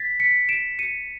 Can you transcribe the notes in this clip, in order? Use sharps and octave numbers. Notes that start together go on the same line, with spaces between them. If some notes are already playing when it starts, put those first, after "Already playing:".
Already playing: A6 B6
B6 C#7
D7 E7
C#7 D#7